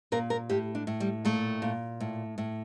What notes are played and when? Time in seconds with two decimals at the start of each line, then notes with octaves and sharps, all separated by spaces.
0.12 A#2 A#4
0.30 A#4
0.49 A2 G4
0.75 D4
0.87 A2
1.00 G3
1.25 A#2 A3
1.62 A#2
2.00 A2
2.38 A2